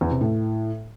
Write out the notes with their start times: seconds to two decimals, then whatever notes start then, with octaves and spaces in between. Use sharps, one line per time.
0.01 E2
0.11 C3
0.21 A2